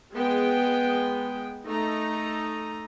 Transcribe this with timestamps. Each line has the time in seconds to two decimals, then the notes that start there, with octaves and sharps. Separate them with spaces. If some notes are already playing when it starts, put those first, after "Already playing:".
0.14 G#3 B3 G#4 G5
1.67 A3 D#4 A#5